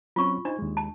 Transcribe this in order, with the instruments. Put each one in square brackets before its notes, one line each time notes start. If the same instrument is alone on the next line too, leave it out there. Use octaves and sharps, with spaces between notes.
[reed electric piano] F#3 C4 C#4 [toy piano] F4 C#6
[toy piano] D4 [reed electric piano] D#4 C5
[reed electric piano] D#2 G#3
[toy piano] A5